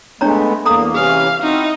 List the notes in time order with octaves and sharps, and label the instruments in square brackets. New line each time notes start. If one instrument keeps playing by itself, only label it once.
[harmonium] G#3 A3 B3 [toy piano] D4 C#5 A#5
[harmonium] E2 A#3 [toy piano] A4 A#5 D#6
[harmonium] C3 E3 C#4 [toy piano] G#4 [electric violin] F5
[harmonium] C4 E4 F#4 [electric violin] D#4